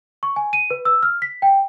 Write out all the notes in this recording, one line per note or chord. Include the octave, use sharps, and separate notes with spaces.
C#6
G#5
D#7
B4
E6
F6
B6
G5